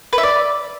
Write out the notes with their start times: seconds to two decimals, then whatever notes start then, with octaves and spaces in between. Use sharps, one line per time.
0.13 B4
0.18 E5
0.23 D5